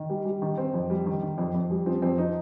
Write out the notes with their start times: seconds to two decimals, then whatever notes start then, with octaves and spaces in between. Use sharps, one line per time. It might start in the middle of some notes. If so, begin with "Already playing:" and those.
Already playing: D#3
0.10 G3
0.25 G3
0.42 D#3
0.58 D#3 C4
0.74 F2
0.90 G3
1.06 D#3
1.22 D#3
1.38 F2
1.55 F2
1.71 G3
1.86 F3 C4
2.02 F2 C4
2.18 F3 D#4